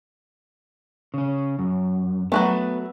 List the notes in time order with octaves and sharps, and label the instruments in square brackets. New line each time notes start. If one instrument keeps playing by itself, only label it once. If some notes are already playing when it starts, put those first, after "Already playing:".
[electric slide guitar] C#3 C#4
F#2
[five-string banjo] F#3 G#3 A3 [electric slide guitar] B3 B4